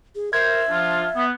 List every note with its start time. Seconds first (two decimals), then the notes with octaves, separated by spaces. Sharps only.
0.15 G#4
0.33 A#4 C5 E5 G#6
0.69 F3 D4 F4
1.16 B3